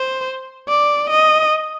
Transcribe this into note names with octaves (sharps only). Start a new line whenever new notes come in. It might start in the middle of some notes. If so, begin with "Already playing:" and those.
Already playing: C5
D5
D#5